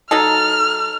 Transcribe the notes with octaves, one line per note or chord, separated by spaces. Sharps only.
F#3 D#4 A4 F6